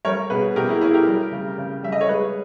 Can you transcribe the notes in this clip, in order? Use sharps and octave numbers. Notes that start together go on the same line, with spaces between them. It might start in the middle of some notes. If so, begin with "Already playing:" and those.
G3 A#4 C#5
B2 G#4 B4
B2 G4 A#4
E4 G#4
C#4 E4 G#4
G4 A#4
G3
C#3
C#3
G3 E5
D#5
C#5
G#3 G#4 B4